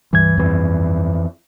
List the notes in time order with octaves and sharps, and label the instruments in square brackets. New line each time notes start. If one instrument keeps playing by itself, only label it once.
[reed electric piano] C#2 G2 G#6 [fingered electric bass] E3
[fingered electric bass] F2 E3